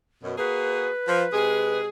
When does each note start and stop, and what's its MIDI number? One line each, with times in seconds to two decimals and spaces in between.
0.24 0.37 42
0.24 0.37 47
0.38 0.89 58
0.38 0.89 66
0.38 0.89 68
0.38 1.80 71
1.07 1.23 53
1.33 1.88 48
1.33 1.88 56
1.33 1.88 68